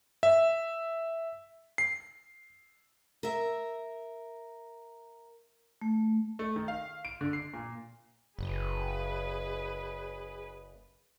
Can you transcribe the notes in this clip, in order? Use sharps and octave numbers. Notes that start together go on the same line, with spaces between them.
E5
C7
A#4 E5
A3
A3
D#3
F5
D7
D3
C7
A#2
F#1 G#4 B4